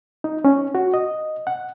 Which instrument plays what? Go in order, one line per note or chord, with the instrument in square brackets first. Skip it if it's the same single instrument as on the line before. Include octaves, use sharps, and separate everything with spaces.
[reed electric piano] D#4
C#4
F#4
D#5
F#5